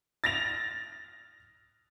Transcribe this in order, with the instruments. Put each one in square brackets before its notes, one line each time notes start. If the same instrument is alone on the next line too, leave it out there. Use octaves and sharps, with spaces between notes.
[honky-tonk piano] A6 A#6 F7